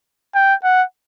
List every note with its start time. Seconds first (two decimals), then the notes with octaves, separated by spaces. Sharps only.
0.35 G5
0.64 F#5